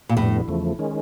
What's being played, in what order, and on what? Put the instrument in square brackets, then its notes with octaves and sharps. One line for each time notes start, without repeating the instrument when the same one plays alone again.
[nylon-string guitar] A#2
[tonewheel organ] F2 D3 G3 B3 [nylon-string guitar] A2
[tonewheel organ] E2 C#3 F3 A3
D#3 G#3 C#4